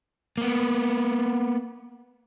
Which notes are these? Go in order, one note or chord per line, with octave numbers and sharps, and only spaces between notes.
A#3 B3